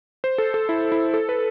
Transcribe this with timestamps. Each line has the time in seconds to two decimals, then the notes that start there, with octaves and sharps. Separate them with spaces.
0.24 C5
0.38 A4
0.54 A4
0.69 E4
0.92 E4
1.14 A4
1.29 B4